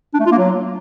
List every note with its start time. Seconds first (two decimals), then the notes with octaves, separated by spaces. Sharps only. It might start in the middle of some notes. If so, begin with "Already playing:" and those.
0.14 D4
0.20 A3
0.26 F4
0.32 A#3
0.38 F#3